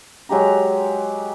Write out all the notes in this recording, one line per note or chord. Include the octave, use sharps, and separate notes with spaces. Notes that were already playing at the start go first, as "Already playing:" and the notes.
F#3 G#3 G4 A#5